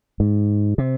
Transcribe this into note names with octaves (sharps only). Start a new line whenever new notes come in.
G#2
C3